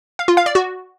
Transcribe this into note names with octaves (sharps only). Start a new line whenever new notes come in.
F5
F4
F5
D5
F#4